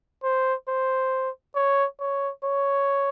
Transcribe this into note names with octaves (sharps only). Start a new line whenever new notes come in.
C5
C5
C#5
C#5
C#5